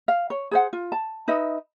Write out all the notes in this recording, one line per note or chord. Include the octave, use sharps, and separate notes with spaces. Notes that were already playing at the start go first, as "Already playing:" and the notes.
F5
C#5
G#4 C5 F#5
F4
A5
D#4 B4 D#5 E5